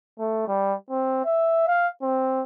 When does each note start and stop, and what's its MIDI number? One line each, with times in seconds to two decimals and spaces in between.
0.19 0.45 57
0.48 0.74 55
0.90 1.20 60
1.25 1.63 76
1.67 1.89 77
2.02 2.43 60